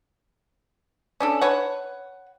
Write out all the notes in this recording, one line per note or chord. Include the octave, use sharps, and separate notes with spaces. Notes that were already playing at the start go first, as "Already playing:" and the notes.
C#4 D4 A4
B4 C#5 F#5